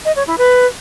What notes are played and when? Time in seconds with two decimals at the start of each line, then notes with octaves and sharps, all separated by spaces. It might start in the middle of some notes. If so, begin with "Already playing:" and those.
0.05 D#5
0.16 C#5
0.27 E4
0.38 B4